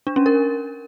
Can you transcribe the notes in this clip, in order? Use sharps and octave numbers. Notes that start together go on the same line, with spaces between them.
D4
C#4
A#4